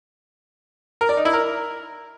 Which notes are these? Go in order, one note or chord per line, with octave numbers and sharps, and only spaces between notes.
A#4
D5
D#4
E4
A#4